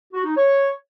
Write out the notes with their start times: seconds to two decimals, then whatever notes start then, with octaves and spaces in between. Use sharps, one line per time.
0.14 F#4
0.25 D#4
0.36 C#5